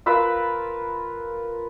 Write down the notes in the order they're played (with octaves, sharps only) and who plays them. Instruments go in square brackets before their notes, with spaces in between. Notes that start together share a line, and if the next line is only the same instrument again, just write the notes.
[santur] F4 A#4 B4 E6